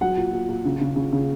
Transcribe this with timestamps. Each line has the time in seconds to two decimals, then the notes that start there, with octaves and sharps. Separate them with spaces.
0.01 F#3 F#5
0.17 A#2
0.33 A#2
0.49 A#2
0.65 C#3
0.81 C#3
0.96 C#3
1.13 C#3